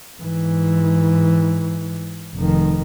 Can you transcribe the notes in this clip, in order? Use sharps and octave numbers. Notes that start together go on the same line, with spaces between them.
G#2 E3
F1 D#3